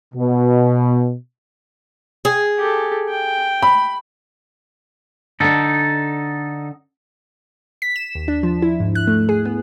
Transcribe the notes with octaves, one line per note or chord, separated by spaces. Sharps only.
B2
G#4
G4 A4
G5
B5
D3 D4 D#4 A4
B6
E7
D#2
D4
F3
E4
G#2
F#6
A3
G#4
B3